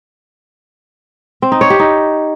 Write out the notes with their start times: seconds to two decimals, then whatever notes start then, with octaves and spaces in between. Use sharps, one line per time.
1.42 C4
1.52 D#4
1.61 C#5
1.70 G4
1.80 D#4